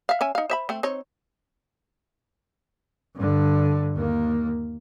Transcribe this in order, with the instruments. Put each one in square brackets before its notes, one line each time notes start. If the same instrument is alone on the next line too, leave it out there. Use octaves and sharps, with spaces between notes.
[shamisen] E5 F5
C#4 E5 G#5
D#4 F5
C5 E5 B5
A3 C4
C4 D#4 C#5
[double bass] G2 D3
D#2 A#3